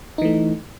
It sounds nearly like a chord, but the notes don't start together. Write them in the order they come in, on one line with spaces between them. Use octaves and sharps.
D#4 E3 A3